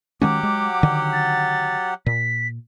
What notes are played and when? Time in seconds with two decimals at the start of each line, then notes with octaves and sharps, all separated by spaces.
0.22 D#3 F#3 G#3 C#4 G4 F#5 D6
0.43 G#3
0.83 D3 D#3
1.13 A6
2.06 A#2 B6